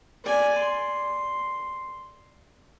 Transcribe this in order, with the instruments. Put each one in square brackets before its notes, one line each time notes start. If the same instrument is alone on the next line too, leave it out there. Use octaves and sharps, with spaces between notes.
[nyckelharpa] D5 G#5
C6